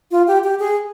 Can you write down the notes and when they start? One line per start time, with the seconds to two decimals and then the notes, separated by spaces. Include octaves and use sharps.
0.11 F4
0.27 G4
0.44 G4
0.59 G#4